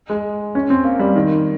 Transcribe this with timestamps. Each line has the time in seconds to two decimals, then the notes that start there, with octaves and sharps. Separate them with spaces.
0.10 G#3
0.55 C#4
0.70 C4
0.84 A#3
0.99 G3
1.16 D#3